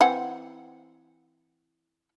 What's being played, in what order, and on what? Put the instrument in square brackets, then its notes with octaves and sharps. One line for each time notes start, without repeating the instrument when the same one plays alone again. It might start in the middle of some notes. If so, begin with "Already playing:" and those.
[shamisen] E3 C4 F#5